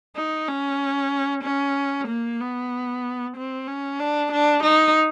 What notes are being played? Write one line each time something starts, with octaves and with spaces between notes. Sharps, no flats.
D#4
C#4
C#4
A#3
B3
C4
C#4
D4
D4
D#4